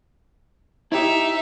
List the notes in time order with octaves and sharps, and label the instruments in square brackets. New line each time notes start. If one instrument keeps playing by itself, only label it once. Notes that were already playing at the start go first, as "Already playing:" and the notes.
[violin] D#4 E5 [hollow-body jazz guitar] E4 G4